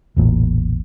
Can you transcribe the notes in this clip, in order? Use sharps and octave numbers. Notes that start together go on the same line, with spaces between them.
E1 A1 A#2